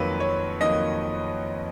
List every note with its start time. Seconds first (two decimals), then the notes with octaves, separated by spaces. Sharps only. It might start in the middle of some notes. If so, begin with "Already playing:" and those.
Already playing: F2 D#3 F#3 A#3 B4
0.20 C#5
0.60 F2 D#3 F#3 A#3 D#5